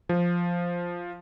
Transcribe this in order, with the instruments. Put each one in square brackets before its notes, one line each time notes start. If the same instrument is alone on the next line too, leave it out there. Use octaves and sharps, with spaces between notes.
[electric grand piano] F3